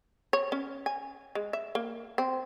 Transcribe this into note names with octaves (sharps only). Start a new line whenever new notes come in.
C#5
C#4
G#5
G#3
E5
A#3
C4